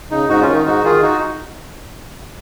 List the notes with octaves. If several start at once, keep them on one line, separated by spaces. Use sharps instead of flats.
C#3 D#4
G#2 D#4 F#4
C#4 F4
D#3
D#4
G#2 D#4 F#4
D#3 F4 G#4
D#4 F#4